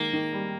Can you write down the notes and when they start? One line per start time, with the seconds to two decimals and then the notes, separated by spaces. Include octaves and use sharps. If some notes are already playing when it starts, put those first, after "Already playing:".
Already playing: D#3 G#3 A#3
0.13 D#3
0.33 G3